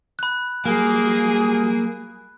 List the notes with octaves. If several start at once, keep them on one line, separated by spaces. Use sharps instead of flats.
B5 F#6
F#3 G3 A#3 G#4